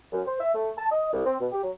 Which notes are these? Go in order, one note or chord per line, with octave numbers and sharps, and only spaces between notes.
F#2
C5
E5
A3
A5
D#5
C2
C4
B2
G4
F#3